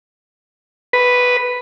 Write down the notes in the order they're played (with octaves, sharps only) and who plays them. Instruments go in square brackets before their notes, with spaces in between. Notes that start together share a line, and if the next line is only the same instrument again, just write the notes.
[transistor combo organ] B4